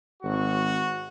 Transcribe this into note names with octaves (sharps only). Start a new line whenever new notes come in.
G#1 F#4 C#6